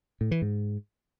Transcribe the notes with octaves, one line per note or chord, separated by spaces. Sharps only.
A2
E3
G#2